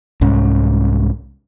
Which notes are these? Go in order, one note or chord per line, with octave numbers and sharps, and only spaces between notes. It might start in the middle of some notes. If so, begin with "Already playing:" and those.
C2 G#2 C#4